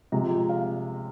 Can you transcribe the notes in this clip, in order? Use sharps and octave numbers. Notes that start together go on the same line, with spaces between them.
C3 F3 G#3 A#5
F5